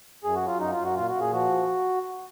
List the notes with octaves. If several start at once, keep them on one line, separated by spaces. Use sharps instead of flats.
F#2 G#4
F#4
F#3
F4
F#2 D#4
F4
F#2
F#4
A#2 F4
F#4
A#2
G#4
F3 F#4